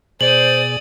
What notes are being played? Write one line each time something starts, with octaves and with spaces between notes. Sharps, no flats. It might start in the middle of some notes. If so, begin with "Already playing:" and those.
B2 G#4 C5 D5 D#6 F#7